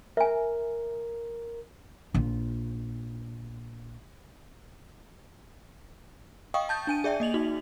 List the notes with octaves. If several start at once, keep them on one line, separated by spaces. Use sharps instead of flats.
A#4 E5 G#5
A#1 F4
D#5 F5 G5 C#6 D#6
A5 G6 A6
D4 G#5 D#7
G#4 D5 E5 G5
A#3 D#5 F7 F#7
D#4 F#4